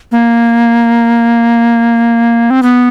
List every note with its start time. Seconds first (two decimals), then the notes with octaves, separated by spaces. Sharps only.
0.12 A#3
2.50 C4
2.63 B3